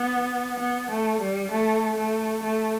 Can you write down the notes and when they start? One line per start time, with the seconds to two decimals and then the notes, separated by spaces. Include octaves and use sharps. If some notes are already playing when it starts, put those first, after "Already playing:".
Already playing: B3
0.60 B3
0.91 A3
1.21 G3
1.52 A3
1.97 A3
2.43 A3